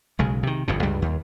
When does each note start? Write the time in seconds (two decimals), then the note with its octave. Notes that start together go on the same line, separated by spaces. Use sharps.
0.19 B1 C#3 G#3
0.43 C3 D#3
0.68 G1 F2 B2
0.82 C#2 G2 G3
1.02 D#2